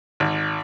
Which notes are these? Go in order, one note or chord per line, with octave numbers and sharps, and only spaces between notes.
G#1